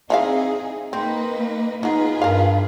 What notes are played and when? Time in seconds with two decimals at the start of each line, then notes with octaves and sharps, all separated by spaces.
0.10 E3 C4 D#4 G#4 E5 F5
0.93 A#3 C4 D#4 B4
1.83 D#3 B3 D#4 F4 G#4 B4
2.22 G2 A#4 F5